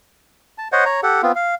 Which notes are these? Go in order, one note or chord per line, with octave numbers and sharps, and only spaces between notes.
A5
C5 C#5 D#5 F#5
C#5 A#5
G4 A4 F#5
B3 C4 F4
F5